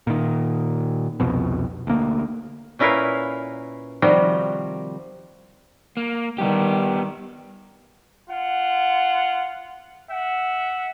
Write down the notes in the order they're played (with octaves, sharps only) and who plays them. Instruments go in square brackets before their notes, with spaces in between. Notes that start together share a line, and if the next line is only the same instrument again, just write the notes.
[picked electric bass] A#2 D#3
C2 F2 B2
D2 A#3
[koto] A#2 C#4 E4 A#4 B4 F5
C3 D#3 F3 G3 F#4 A#4
[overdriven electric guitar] A#3
[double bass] D#3 G3 [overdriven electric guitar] B3 G4
[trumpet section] F4 F#5
E5 F#5